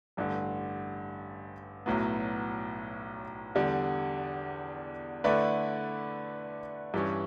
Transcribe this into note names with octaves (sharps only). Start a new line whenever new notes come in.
A1 G2 D3
B1 A2 F#3 B3
E2 D3 G3
D3 A3 E4 B4 D5
G2 E3 G3 C#4